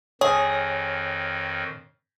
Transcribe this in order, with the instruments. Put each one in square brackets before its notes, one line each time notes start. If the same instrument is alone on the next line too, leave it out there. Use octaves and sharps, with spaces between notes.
[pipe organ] F2 D#3 [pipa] G#4 [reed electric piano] C#5